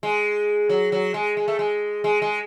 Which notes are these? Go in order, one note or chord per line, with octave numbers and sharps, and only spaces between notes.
G#3
F#3
F#3
G#3
G#3
A3
G#3
G#3
G#3